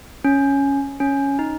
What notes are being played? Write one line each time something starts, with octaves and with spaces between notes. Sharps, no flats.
C#4
C#4
D#4